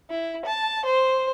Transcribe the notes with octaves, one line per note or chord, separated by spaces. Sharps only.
E4
A5
C5